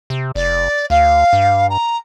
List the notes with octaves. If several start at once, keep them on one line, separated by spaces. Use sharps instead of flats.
C3
F1 D5
D2 F5
G2
A#5